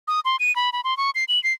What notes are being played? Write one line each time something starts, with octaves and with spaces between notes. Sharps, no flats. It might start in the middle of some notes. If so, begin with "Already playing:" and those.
D#6
C6
D#7
B5
B5
C6
C#6
C7
F#7
C7